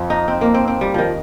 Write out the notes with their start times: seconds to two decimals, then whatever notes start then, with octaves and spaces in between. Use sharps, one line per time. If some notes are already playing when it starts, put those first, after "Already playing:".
Already playing: F2 C4
0.10 D#4
0.28 C4
0.41 A#3
0.54 C4
0.68 C4
0.81 G3
0.94 D#3 F3